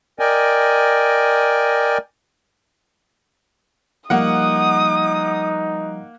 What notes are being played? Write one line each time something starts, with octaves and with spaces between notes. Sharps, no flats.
A#4 D5 D#5 G5 G#5
F3 G3 A#3 D#4 F#5 D#6